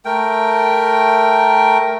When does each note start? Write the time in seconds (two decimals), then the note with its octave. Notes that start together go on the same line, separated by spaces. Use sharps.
0.05 A3 A#4 G5